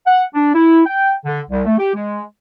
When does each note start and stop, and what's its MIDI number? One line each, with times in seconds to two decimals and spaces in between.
0.06 0.24 78
0.34 0.50 62
0.53 0.80 64
0.85 1.12 79
1.25 1.41 50
1.50 1.65 36
1.66 1.73 57
1.78 1.92 67
1.94 2.22 56